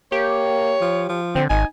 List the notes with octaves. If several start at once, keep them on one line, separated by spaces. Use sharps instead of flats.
A#3 G4 C#5
F3
F3
D3 C4
G#1 D#4 G#5